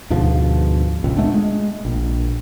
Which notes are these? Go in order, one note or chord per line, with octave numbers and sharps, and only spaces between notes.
D2 G#2 B2 F3
C#2 A#2
G#3 A3 B3 D4
G#3
A#1